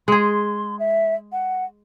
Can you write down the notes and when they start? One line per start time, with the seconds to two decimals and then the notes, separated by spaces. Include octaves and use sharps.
0.08 G#3 G#4 C6
0.79 E5
1.32 F#5